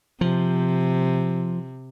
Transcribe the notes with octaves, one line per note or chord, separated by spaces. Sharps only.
C3 F3